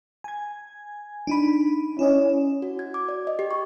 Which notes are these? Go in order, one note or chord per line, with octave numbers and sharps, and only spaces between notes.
G#5 G#6
D4 D#4 B5
C#4 E4 D5 D#5
F#4
G#6
D6
D5
D#5
G4
C#6